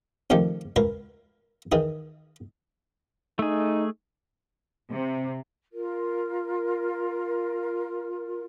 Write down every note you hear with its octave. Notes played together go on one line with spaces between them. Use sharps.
C3 D#3 F3 A3 G4
C#2 A#4 B4
D#3 E3 G#4
A3 D#4 G#4
C3
F4 A#4